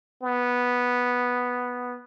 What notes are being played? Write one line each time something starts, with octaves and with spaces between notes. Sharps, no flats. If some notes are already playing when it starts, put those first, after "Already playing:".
B3